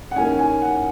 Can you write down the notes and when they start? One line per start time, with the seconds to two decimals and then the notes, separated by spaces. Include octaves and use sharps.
0.11 F#5
0.16 D#3 A#3 C#4 G#5
0.39 G#5
0.62 F#5